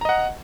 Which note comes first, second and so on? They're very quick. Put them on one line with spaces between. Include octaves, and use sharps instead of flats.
A#5 D#5 F#5